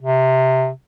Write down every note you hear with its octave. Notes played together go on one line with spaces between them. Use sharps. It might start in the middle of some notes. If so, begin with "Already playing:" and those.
C3